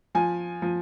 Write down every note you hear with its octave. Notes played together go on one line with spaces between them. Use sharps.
F3 G#5
F3